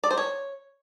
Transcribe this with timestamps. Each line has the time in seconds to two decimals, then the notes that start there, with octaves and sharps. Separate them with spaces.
0.04 D5
0.11 C5
0.18 C#5